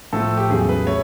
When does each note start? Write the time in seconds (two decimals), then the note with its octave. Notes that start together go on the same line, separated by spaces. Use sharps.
0.13 A2 F3 A3 A4
0.37 G4
0.50 E2 C#3 F#3 A3 G#4
0.69 B4
0.87 A3 C#5